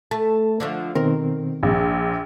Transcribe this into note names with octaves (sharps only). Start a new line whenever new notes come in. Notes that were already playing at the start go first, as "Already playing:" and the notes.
A3 A5
D3 F3 A3
B2 D#3 C4 A#4
A#1